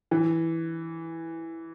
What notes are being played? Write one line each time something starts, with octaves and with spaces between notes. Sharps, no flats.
E3